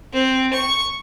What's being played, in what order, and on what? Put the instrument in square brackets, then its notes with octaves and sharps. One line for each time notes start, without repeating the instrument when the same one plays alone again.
[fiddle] C4
C#6